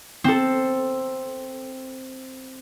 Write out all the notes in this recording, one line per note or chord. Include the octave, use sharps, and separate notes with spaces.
C4 A4